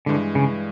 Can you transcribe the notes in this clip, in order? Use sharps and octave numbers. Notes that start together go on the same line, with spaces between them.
G2 D3 E3 G#3
C#3